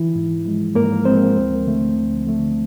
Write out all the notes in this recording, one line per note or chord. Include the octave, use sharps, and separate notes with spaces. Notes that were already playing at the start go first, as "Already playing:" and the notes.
Already playing: E3 E4
G#2
F3 G#3
G#2 A#3 A#4
F3 G#3 C4 C5
D2
D3 F3 A3
D2
D3 F3 A3